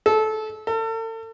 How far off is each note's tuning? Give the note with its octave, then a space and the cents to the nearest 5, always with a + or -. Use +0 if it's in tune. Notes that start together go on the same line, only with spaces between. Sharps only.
A4 -20
A4 +40